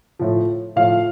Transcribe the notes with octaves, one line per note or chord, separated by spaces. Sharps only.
A2 F3
A2 F3 F5